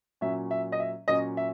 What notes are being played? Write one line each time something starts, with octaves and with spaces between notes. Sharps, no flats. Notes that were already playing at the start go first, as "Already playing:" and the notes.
A#2 F#3 C#4 E5
E5
D#5
E5
A#2 F#3 C#4 D#5
E5